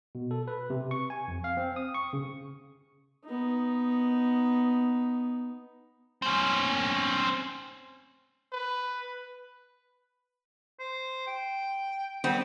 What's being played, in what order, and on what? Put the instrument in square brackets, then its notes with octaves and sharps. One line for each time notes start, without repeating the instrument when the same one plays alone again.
[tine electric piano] B2
A4
B4
C3
C#6
G#5
F2
F5
C4
D#6
C#6
C#3
[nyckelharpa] B3 D#4
[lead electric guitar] C4 C#4
[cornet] B4
[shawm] C5
G5
[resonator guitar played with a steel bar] G3 B3 C4